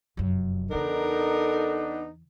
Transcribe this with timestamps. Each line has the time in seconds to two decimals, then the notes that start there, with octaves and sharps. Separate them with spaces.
0.17 F1 F#2
0.71 E2 C#3 B3 D4 D#4 A4 A#4